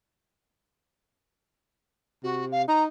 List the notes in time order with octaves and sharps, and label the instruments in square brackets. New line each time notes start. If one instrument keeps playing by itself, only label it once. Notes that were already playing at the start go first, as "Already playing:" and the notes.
[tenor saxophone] C3 [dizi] F#4
[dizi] F5
[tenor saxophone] D#4 [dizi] A#5